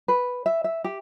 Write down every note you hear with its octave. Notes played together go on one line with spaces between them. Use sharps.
B4
E5
E5
G4